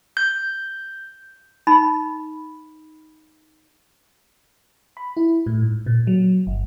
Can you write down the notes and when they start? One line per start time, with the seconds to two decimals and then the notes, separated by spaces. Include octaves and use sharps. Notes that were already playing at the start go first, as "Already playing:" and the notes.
0.17 G6
1.67 D#4 B5
4.97 B5
5.17 E4
5.46 A2
5.62 G#2
5.86 A#2
6.07 F#3
6.47 G1